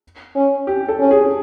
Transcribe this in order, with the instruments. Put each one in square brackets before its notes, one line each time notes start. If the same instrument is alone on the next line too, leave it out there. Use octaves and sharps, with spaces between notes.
[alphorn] C#4
[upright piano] G4
A4
[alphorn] C#4
[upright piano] G#4